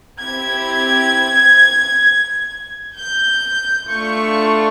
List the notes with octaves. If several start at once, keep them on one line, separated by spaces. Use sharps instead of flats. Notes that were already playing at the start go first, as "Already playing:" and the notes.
C4 E4 G4 G#6
G6
A3 D4 F4 C#6